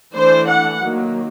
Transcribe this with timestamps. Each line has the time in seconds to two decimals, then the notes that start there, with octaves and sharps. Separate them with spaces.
0.14 E3 A3 D4 C5
0.47 F#5
0.80 D#3 F#3 A#3